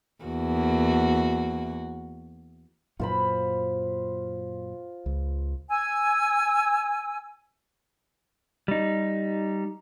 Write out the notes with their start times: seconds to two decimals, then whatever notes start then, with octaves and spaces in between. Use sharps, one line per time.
0.24 E2 A#3 F#4
3.00 F#2 A#2 F#3 F4 C5 B5
5.06 C#2
5.70 G#5 E6
8.68 G3 D#4